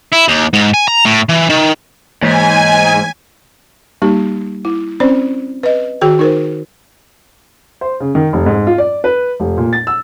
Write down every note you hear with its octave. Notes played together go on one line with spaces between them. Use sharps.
E4
D#2
G#2
G#5
A#5
A2
E3
D#3
G#2 E3 G#5 B6
G3 A#3 D#4 G4
E4
C4 C#4 C5 D5
B4 D#5
D#3 F#4 G#4 G5
D#4 A#4 C5
C5
C#3
D#3
F1
G#2
F4
D5
B4
F1
A#2
A6
E6